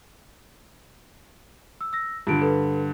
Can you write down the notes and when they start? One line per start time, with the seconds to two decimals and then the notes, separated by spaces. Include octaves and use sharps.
1.81 E6
1.93 E6 A#6
2.27 G2 D3 F4 D7
2.42 A4 B4